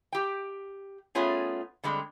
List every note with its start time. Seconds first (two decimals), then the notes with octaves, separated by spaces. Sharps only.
0.12 G4 G5
1.15 A3 B3 C#4 F4 G#4
1.84 D3 G3 G#3 C4